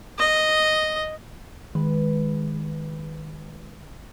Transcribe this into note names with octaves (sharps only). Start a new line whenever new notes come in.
D#5
D#3 G#3 B4